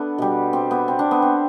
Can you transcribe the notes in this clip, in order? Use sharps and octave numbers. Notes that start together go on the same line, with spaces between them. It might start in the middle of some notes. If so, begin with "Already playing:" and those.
Already playing: B3 D4 A4
B2 G3
C4
B3
C4
D4
B3
C4